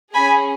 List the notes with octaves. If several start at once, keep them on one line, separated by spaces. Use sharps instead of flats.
C#4 G#4 G#5 B5